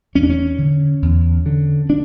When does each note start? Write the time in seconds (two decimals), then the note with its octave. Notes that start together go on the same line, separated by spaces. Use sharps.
0.15 E2 C#4
0.23 D4
0.30 C#4
0.58 D3
1.02 E2
1.46 D3
1.90 D4